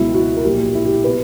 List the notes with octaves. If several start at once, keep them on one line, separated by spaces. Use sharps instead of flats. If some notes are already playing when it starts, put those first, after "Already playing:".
Already playing: C#2 B2 F#3 E4
F#4
A#4
A#1 A#2 F#3 G4
E4
G4
B2 F#3 B4